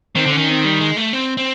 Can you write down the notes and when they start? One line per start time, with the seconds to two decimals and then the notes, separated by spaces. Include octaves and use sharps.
0.15 D#3 C4
0.26 D3
0.32 C#4
0.38 D#3
0.48 C4
0.65 G3
0.80 G#3
0.97 A3
1.13 C4
1.37 C4